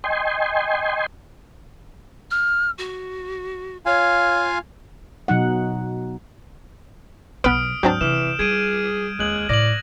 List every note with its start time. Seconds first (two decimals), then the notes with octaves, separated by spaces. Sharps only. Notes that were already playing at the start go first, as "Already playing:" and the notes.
0.04 D#5 G5 G#5 C6
2.31 F6
2.78 F#4
3.86 F4 C#5 F5 G#5
5.28 B2 F#3 D#4 F#5
7.44 B1 F#3 B3 B4 D#6 F6 D7
7.83 D#2 G#2 F#3 C4 D4 G6
8.01 C3 E3 F6 E7
8.39 G3 G#4 G#6 D7 D#7
9.19 D#2 G#3 F#6 F#7
9.49 A2 D5 A#6 F#7